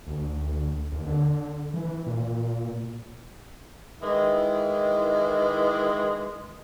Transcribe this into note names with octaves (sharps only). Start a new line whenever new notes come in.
D2
D#2
D3
E3
A#2
D#3 E3 G#3 E4